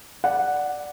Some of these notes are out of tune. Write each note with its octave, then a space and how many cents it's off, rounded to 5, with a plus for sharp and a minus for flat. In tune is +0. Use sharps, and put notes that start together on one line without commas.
D5 +0 F#5 +0